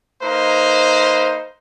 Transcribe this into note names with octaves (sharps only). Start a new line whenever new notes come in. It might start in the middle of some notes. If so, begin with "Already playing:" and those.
A#3 D#4 B4 C5